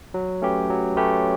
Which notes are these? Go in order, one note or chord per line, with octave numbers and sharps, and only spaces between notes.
F#3
A3 C#4 G4 B4
F#3
A3 C#4 G4 B4